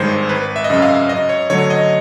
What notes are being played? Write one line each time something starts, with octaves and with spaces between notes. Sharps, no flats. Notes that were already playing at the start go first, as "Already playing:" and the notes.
Already playing: G#1 G2 D#3 G#3 C5 C#5
G#1 B4
E5
D#5
F#2 C#3 E5
F5
F#2 D#5
C#5
D3 F#3 A3 C#5
D#5